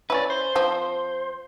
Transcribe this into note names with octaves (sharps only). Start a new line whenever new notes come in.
C#4 E4 B4 D5
C5
F3 C4